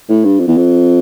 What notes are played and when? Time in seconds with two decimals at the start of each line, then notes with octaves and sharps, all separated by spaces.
0.09 A2
0.24 G2
0.39 F2
0.48 E2
0.57 F2